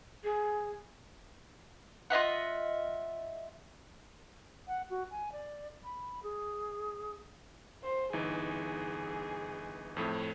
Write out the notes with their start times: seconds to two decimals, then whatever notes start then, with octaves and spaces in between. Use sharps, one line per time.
0.24 G#4
2.10 F4 D#5 E5 F#5
4.68 F#5
4.90 F#4
5.11 G#5
5.32 D5
5.84 B5
6.23 G#4
7.83 C5
8.13 G1 E3 D#4 G#4
9.97 F2 A2 A3